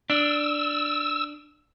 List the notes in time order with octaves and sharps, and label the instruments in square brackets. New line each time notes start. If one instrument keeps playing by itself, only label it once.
[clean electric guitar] D4 [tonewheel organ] E6